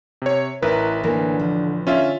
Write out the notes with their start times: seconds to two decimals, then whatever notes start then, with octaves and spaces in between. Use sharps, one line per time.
0.22 C3 C#5
0.62 A1 E4 A#4 B4
1.04 D3 E3 A#3 A#4
1.39 F3
1.87 D3 C#4 F4 E5